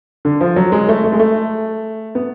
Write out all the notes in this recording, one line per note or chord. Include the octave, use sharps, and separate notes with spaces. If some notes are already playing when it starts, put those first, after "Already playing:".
D3
F3
F#3
G#3
A3
A3
G#3
A3
B3